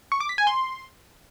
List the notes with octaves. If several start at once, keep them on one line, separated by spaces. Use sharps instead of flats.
C#6
D6
B6
G#5
C6